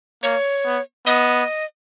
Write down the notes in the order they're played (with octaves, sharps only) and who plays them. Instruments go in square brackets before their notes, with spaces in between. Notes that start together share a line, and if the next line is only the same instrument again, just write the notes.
[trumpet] A#3 [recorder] C#5
[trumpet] B3
[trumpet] B3 [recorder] D#5